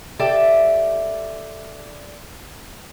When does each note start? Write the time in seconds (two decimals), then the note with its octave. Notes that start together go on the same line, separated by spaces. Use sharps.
0.19 G4 A4 D5 E5